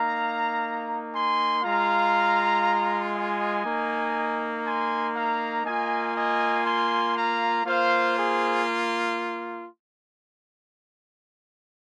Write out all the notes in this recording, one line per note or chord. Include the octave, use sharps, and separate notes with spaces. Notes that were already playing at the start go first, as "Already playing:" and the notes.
Already playing: A#3 D#4 F5 A#5
G#5 C6
G#3 F4 F5 A#5
D#5 G#5
A#3 D#4
G#5 C6
F5 A#5
A#3 F4 D#5 G#5
D#5 G#5
G#5 C6
F5 A#5
A#3 F4 C5 F5
G#4 C5